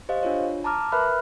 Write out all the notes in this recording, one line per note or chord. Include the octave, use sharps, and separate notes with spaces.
G4 C5 D#5 F5
D4 F4 C#5
A5 A#5 D6 F6
A#4 B4 E5 B5 F6 F#6